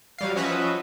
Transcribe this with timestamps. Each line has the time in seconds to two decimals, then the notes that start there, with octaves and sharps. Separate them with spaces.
0.18 F#3 G3 F5
0.36 F3 C#4 F#4 B4 D#5 E5